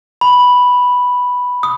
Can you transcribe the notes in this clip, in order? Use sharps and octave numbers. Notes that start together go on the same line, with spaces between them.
B5
D#6